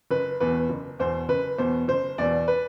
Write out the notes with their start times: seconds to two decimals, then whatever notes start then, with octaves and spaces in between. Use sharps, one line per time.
0.11 F#1 B4
0.40 E2 B2 B4
0.69 F#1
0.99 E2 B2 C5
1.29 F#1 B4
1.58 E2 B2 C5
1.88 F#1 C5
2.18 E2 B2 D5
2.48 B4